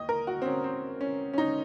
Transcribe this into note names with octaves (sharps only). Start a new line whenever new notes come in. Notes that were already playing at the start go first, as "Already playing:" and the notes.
Already playing: D#2 D#5
A#4
F#4
C4
C#4
C4
C#4
C#4
D#4